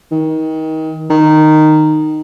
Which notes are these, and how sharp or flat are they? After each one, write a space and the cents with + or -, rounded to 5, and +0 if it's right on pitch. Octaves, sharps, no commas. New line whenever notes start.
D#3 +25
D#3 -10